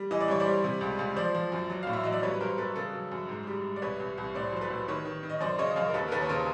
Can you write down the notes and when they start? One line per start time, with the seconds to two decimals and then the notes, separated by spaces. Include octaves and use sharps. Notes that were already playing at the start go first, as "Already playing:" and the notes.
Already playing: G3
0.11 E3 D#5
0.20 D5
0.28 G2 C#5
0.40 C5 D5
0.46 G3
0.64 C3
0.81 C#2
0.99 C#2
1.16 F3 C5 D5
1.35 F3
1.52 F#2
1.70 F#3
1.83 A2 F5
1.93 E5
2.03 F#3 D#5
2.13 D5
2.23 G2 B4 C#5
2.33 B4
2.40 G2 A#4 C5
2.58 G2 A4 B4
2.75 C#3 A4 B4
2.93 F#3
3.12 F#2
3.29 G#2
3.47 G3
3.64 G3
3.76 D5
3.82 C2 B4 C#5
4.00 C2
4.18 C2
4.35 A2 C5 D5
4.52 F#3 C5
4.61 A4 B4
4.70 A2
4.88 D#3 B4 C#5
5.05 D#3
5.23 D#3
5.29 D#5
5.41 F#2 C5 D5
5.59 C#3 C#5 D#5
5.76 F#2 D#5 F5
5.88 A#4
5.94 D#2 A4 B4
6.08 A#4
6.12 D#2 A4 B4
6.22 C#5
6.29 C#3 A#4 C5